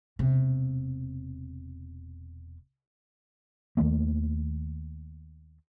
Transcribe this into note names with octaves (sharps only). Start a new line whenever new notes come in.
E1 C3
D#2 D#3 A3 A#3